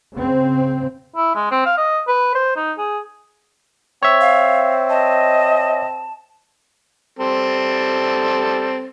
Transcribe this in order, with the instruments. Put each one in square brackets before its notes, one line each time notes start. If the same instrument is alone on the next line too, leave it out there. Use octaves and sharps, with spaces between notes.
[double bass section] C#3 C4
[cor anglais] E4
G#3
C4
F5
D#5
B4
C5
D#4
G#4
[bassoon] C4 [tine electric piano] C#5 E5
[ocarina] F5
[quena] D#5 [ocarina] A5
[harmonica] G3 C4 A4